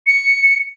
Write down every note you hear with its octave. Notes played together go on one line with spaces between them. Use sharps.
C#7